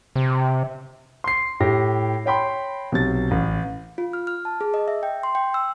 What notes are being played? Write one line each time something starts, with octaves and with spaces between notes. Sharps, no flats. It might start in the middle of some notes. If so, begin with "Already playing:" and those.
C3
C6 C7
A2 G4 A#6
C#5 G5 B5 C6
B1 C3 A6
A1
F4
F6
F6
A5
G#4
D#5
E5
G5
C6
G5
E6